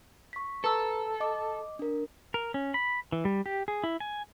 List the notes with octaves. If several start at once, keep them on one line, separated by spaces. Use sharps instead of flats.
C#6 B6
A4 B4 A#5 E6
D#5 D6
D4 A#4
A#4
C#4
B5
E3
G3
G4
G#4
E4
G#5